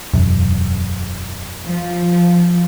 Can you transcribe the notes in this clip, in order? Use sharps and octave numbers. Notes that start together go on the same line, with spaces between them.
E1 F#2
F3